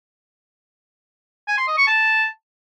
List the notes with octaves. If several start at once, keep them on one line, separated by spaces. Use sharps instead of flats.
G#5
C6
D#5
C#6
A5